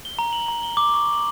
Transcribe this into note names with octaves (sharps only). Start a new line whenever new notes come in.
G7
A#5
F#7
A#5
G7
D6
C#6
F#7